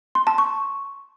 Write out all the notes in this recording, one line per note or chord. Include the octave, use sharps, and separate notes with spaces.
C6
A5
C#6